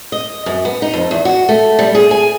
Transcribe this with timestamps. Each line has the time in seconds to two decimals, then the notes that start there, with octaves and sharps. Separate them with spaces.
0.12 D#5
0.46 F#2
0.65 B3
0.82 D#4
0.93 F2
1.11 E2
1.25 F#4
1.49 A3
1.79 G3
1.95 G#4
2.11 G#5